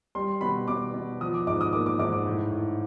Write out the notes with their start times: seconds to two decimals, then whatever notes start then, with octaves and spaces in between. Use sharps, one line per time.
0.15 G3 C6
0.41 B2 B5
0.68 B2 D6
0.94 B2
1.21 F3 D#6
1.34 D6
1.47 G#2 D6
1.61 D#6
1.73 A#3 D6
1.86 D6
1.99 G#2 D6
2.13 D6
2.27 A2
2.52 A2